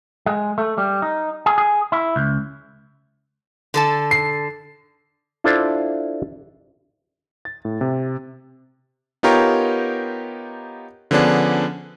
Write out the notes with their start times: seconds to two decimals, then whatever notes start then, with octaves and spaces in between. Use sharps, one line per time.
0.26 G#3
0.58 A3
0.78 G3
1.02 D#4
1.46 G#4
1.58 G#4
1.92 E4
2.16 C#2
3.74 D3 A4 A5
4.11 C7
5.44 D4 E4 F4 A4 C5 D5
7.45 A6
7.65 A2
7.81 C3
9.23 B3 D#4 F4 G4 A#4 C#5
11.11 D3 F3 B3 C#4 D4 G#4